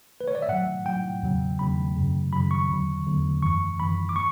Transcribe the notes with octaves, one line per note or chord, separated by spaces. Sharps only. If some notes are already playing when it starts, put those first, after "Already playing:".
B4
C#5
D5
E5
A2 F#3 F#5
A2 F#3 G5
E2 C#3 F#3
E2 C#3 F#3 B5
F#2 C#3 F#3
F#2 C#3 F#3 B5
C#6
E2 D3 F#3
E2 D3 F#3
F#2 E3 C#6
F#2 E3 B5
D6
C#6